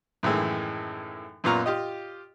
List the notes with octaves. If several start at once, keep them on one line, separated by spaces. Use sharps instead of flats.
F#2 A2 D#3 E3 G#3
F#2 A#2 B3 F4 A#5 C#6
F4 G4 D#5